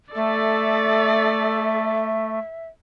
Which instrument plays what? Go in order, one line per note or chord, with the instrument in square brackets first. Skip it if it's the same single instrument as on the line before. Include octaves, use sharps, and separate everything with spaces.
[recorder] A3 [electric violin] A4 D5 [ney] E5